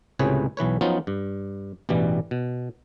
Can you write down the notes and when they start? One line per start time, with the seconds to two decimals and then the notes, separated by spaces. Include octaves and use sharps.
0.19 C#2 A2 C3 G#4 B4 C#5
0.57 B1 E3 B4 C#5
0.81 F3 F#3 B3 C#4 D#4 F4
1.07 G2
1.89 A1 G2 B2 E3 G3
2.31 B2